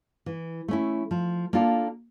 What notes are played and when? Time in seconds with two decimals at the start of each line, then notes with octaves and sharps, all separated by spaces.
0.26 E3
0.68 A3 C#4 E4
1.11 F3
1.53 A#3 D4 F4 A4